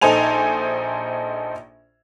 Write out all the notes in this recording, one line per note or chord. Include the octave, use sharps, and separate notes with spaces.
A#1 D#4 A4 C5 G#5 F7